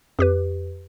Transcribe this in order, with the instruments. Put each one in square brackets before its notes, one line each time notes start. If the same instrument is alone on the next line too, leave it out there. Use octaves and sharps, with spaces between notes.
[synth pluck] F2 G4 B4